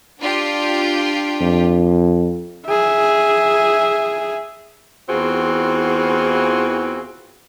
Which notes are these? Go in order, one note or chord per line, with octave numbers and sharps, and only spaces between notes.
D4 F4 G4
F2
G#4 E5
E2 E3 C4 F4 F#4 G#4